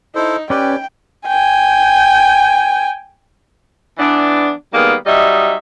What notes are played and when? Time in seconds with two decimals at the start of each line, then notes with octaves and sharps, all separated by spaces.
0.15 D#4 E4 A4 C5
0.50 C#4 G4 B4 D5 G5
1.28 G5 G#5
3.99 E3 B3 D4
4.74 D#3 G3 G#3 A#3 B3
5.07 F#3 G3 D#4 D#5 E5